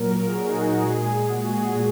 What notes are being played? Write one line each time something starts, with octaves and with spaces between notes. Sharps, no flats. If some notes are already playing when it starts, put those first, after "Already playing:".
Already playing: A#2 F#3 A#4
A#4
G#4
F#4
D#4
F#4
A#2 G#3 G#4
G#4
F#4
G#4
A#2 G#4